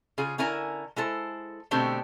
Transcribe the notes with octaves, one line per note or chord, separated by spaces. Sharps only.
C#3 F4 G#4
D3 C#4 E4 A#4 G#5 A#5
G#3 E4 A4 C5
B2 D3 A3 C4 D4 G4